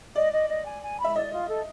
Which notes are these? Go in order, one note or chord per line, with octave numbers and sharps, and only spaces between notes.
D5 D#5
D#5
D#5
G#5
G#5
B5
E5
D5 D#5
F4
A4